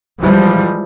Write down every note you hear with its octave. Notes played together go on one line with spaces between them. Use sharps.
E3 F3 G3 G#3